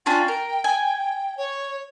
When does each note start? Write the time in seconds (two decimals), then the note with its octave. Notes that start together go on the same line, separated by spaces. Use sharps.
0.06 C#4 D4 F4 G5
0.28 A#4
0.64 G#5
1.37 C#5